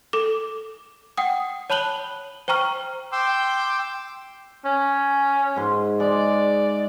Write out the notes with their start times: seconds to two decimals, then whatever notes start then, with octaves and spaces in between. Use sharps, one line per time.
0.13 A4 D6
1.17 F#5 G5 D#6
1.70 C#5 A5 B5 F#6 F#7 G7
2.48 C5 G5 A#5 C#6 F6
3.12 G5 C6 D6 E6
4.65 C#4
5.56 G#2 C6
6.00 G#3 D5 D6